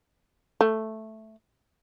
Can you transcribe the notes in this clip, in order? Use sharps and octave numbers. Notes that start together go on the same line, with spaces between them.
A3